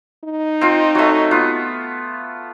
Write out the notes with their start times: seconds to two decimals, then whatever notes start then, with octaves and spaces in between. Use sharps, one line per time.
0.24 D#4
0.61 C4 F4
0.95 F#3 A3
1.31 B3 F4